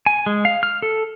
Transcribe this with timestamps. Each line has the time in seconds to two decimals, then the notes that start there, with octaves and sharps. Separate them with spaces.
0.06 G#5
0.26 G#3
0.45 F5
0.63 F6
0.82 A4